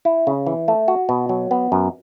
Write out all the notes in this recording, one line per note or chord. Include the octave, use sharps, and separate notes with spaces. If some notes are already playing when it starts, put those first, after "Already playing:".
E4
C#3
E3
A3
F#4
B2
F#3
B3
F#2